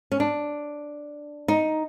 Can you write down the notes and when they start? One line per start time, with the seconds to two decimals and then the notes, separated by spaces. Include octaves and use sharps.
0.12 C#4
0.20 D4
1.48 D#4